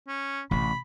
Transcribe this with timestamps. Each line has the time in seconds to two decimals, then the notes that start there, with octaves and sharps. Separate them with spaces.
0.08 C#4
0.51 A1 C3 E4 B5